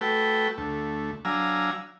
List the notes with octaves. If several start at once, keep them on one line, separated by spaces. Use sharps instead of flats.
A3 F#4 A4 B4 G5
D2 A3
F#3 D4 F5 G#5 A#5 E6